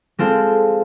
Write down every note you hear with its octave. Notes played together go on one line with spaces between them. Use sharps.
G#3 C4 F4 A4